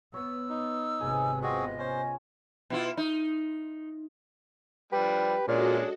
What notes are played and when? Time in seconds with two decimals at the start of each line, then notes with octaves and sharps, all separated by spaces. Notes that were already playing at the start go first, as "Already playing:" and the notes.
0.14 B3 C#5 E6
0.49 D#4
1.01 G#1 C3 B3 G#4 G#5
1.42 C4 F4 F#4 G#4 D#5 F#5
1.79 C#4 C5 C#5
2.70 B2 E4 F4
2.97 D#4
4.92 F3 G3 D4 G4 B4
5.48 A#2 G#3 C#4 D4 F#4 A4 D#5